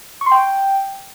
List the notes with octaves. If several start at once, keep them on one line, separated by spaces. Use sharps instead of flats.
C#6
C6
G5